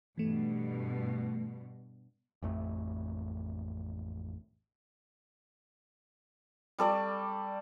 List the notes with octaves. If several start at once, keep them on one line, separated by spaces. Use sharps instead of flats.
G2 B2 E3 A3
A1 F2 A3
G3 A4 D5 C#6